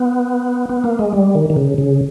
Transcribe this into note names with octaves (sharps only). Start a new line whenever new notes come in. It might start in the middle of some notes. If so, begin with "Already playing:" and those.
Already playing: B3
B3
A#3
G#3
G3
D#3
D#3
C#3
C#3